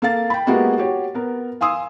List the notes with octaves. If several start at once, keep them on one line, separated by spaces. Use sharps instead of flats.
A#3 A4 F5 A6
G5 B5
G#3 A#3 B3 E4 F#4 G4
F#4 G4 C#5
B3 A#4
F5 G#5 C6 D#6 E6